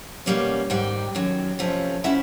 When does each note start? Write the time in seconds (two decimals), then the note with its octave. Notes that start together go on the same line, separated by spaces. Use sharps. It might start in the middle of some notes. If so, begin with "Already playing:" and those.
0.26 B2 G3 A#3 C#4
0.70 G#2 D#3 G3 G5
1.15 F#2 D#3 F#3
1.59 F2 C3 F3 A3 C#4
2.04 C#3 F3 G#3 C#4 E4 E5 F#5